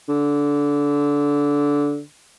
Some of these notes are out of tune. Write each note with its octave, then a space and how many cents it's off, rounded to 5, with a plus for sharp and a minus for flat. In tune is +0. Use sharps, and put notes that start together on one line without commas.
D3 -20